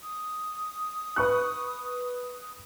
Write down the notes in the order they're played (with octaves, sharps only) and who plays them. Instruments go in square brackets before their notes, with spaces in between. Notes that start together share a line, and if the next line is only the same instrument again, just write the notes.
[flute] D#6
[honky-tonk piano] B4 C#6 F#6